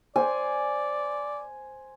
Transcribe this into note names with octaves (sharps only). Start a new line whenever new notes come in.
C5 D5 G#5